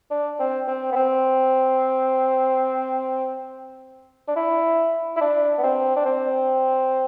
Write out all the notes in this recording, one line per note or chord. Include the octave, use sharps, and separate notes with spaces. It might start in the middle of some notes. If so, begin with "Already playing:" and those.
D4
C4
C4
B3
C4
D4
E4
E4
D4
B3
C4
D4
C4